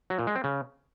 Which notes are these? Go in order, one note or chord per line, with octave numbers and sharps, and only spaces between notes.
F#3
A#2
G#3
C4
C#3